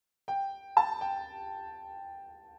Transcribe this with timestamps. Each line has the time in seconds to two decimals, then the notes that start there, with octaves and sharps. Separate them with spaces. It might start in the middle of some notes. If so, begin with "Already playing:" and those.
0.28 G5
0.77 A5
1.01 G5